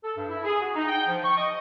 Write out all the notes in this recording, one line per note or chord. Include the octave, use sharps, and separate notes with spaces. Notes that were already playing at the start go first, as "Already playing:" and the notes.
A4
G2
E4
G#4
F#4
D#4
G5
F3
C#6
D#5